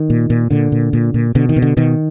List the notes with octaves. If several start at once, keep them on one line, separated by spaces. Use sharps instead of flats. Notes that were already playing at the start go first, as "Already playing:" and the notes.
Already playing: D#3
A#2
A#2
A#2 D3
A#2
A#2
A#2
B2 D3
D#3
B2
D3
B2 D#3